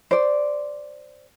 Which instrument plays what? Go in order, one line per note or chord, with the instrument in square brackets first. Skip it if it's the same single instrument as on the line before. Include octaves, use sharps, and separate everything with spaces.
[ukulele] C5 D5